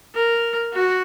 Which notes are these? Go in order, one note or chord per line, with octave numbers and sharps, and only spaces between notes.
A#4
F#4